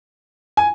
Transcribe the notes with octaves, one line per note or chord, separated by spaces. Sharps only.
G#5